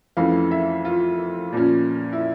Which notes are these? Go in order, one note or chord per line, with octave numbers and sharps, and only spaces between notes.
F2 E3 A3 C#4 F5
E5
F4
A#2 F3 C#4
E4